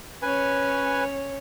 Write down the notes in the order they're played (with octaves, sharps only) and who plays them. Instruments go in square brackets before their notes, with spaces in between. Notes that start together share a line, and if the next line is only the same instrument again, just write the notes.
[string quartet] C#4 C#5 [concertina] B4 G#5